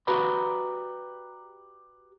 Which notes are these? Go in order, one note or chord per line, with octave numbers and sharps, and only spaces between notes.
F#4 G4 B4 D5 A#5 B5